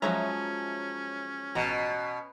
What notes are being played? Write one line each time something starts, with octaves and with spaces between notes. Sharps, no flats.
F3 F#3 G#3 C#4 C#5 E5 A#5
A1 B2 A#5